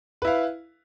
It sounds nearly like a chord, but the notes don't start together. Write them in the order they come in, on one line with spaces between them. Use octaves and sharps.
B4 E4 F5